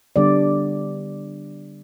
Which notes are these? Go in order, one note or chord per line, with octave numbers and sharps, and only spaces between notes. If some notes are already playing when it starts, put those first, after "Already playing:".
D3 G3 B3 D4 D5